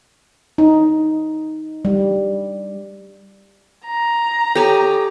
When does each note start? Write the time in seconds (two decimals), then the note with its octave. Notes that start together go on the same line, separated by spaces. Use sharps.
0.58 D#4
1.85 G3
3.85 A#5
4.55 G4 A4 C#5 G#5